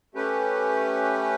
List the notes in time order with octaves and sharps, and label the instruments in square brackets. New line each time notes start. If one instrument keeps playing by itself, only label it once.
[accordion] A3 C#4 G4 B4